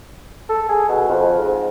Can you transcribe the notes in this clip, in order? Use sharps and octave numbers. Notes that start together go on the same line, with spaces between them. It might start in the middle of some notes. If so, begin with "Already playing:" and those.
A4
G#4
B2
F2
G#2